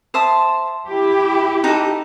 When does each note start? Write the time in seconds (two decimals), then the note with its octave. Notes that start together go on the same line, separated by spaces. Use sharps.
0.14 C5 E5 A5 D#6
0.89 E4 G4
1.64 D#4 F#4 A4